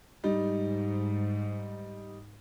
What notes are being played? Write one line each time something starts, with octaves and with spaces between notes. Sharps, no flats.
G#2 G3 D#4